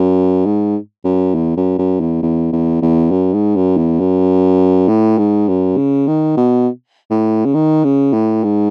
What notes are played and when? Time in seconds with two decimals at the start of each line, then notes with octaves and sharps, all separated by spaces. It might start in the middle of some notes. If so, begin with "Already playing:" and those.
Already playing: F#2
0.45 G#2
1.04 F#2
1.34 E2
1.57 F#2
1.78 F#2
2.00 E2
2.22 E2
2.52 E2
2.82 E2
3.11 F#2
3.33 G#2
3.56 F#2
3.77 E2
4.00 F#2
4.88 A2
5.18 G#2
5.48 F#2
5.77 C#3
6.07 D#3
6.37 B2
7.10 A2
7.45 C#3
7.54 D#3
7.84 C#3
8.13 A2
8.43 G#2